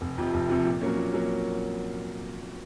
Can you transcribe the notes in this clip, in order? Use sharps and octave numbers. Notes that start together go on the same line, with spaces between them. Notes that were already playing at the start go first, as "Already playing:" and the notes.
F1
F2 C3 F3
F1
F2 C3 F3
A#2
F#3 A#3 C#4
A#2
F#3 A#3 C#4